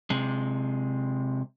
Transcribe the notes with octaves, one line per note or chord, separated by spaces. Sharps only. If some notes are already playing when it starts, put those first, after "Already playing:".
C3 G#3